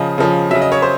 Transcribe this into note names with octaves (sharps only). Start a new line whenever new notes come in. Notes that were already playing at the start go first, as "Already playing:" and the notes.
Already playing: C#3 F3 D#5
C#3 F3
C#3 F#3 E5
D#5
C#5
C5